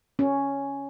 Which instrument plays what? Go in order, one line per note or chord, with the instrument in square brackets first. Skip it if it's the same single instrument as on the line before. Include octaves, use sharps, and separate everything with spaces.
[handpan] C#4